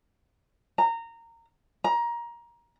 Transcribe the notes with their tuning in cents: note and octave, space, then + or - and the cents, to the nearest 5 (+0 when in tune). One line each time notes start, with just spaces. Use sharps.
A#5 -20
A#5 +20